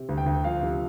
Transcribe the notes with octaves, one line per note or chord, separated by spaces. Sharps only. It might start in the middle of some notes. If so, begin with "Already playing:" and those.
Already playing: C3
D2
G5
D2
F3 F5
C3